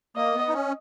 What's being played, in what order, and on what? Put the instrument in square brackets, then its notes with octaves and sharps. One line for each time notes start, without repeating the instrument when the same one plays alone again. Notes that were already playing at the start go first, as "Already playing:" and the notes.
[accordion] A#3 [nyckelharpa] D#5
[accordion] B3
D#4
C#4